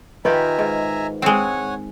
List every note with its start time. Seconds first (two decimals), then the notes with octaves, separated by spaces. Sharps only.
0.25 D#3 F4 G4 B4 E5 G#5 A#5
0.59 G#2
1.22 G#3 C4 C#5 F#5 G#5